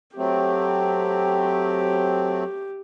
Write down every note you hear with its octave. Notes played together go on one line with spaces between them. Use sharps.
F#3 A3 C4 G4